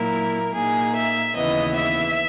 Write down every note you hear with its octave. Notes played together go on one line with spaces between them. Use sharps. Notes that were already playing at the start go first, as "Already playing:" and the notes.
Already playing: A#2 F#3 A#3 E4 A#4
A#2 A#3 D#4 G#4
E5
D#2 C#3 E3 B3 D#5
E5